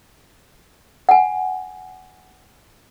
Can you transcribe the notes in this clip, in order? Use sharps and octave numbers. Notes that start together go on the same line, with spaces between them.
F#5 G#5